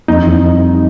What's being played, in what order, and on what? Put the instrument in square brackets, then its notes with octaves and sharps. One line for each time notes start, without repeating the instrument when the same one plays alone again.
[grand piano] F2 [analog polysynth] D#4
[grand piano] E3
E3
G3